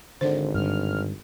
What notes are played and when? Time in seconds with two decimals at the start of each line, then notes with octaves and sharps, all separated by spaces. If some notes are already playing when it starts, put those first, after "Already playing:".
0.21 G#1 D3 C5
0.55 G2 D3 F6